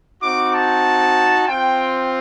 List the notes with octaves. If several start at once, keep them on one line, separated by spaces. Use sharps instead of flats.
C4 D#4 F#4 D6
A5
C4 F4 G5